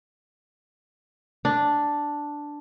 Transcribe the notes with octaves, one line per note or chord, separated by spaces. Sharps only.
D4